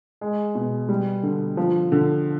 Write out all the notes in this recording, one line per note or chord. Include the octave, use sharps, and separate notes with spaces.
G#3
B2
G3
D3
F3
D3